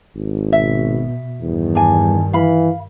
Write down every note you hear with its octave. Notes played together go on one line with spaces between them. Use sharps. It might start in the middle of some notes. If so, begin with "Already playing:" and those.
G#1
B2 E5
E2 G2 D#3 G3
D4 G#5
E3 F5 B5